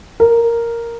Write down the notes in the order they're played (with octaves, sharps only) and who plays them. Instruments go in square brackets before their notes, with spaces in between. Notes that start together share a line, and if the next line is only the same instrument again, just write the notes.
[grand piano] A#4